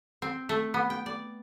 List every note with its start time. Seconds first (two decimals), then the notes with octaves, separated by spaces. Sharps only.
0.22 C4
0.49 A3
0.74 B3
0.90 G5
1.06 D5